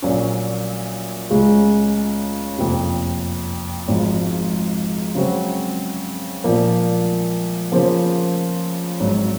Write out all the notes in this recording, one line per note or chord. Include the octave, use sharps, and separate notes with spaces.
A#1 A#2 F#3 C#4
C#2 C#3 G#3 C#4
F#1 F2 C3
G#1 G#2 F3
C#3 F#3 C4 F#4
A#1 A#2 F3 A#3
C#3 F3 A#3 F4 C5
G#1 G#2 F#3